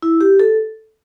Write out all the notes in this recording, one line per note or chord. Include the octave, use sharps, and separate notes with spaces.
E4
G4
A4